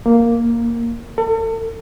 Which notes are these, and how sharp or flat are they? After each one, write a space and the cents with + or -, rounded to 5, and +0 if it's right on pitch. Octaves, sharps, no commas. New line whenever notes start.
A#3 +0
A4 +40